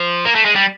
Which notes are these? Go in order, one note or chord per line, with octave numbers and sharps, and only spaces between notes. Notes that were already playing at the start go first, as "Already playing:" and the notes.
Already playing: F3
A#3
A3
G#3
G3